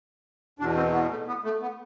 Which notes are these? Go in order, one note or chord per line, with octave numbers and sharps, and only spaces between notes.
E2 B2 D4
C4
B3
A3
B3
A3
B3